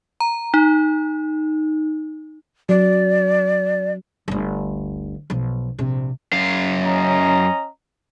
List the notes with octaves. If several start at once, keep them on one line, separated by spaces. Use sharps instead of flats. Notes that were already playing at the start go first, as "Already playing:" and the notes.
A#5
D#4
F#3 D5
G1 D2
B1 F3
A#1 C3
F#2 F5
C#4 D#5 A#5